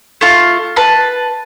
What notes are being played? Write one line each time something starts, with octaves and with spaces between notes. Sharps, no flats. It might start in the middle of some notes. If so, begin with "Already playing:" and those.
A3 F4
B4 A5